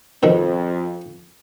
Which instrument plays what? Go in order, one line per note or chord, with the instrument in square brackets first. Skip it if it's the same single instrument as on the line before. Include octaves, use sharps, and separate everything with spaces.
[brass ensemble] F2 [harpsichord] B2 D#3 F3